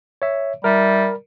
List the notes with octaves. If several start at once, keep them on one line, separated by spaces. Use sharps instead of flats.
C#5 E5
G3 E4 A#4